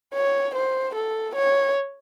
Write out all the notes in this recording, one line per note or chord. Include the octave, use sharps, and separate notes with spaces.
C#5
C5
A4
C#5